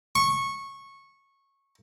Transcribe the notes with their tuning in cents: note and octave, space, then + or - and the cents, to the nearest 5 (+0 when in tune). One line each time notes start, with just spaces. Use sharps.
C#6 -15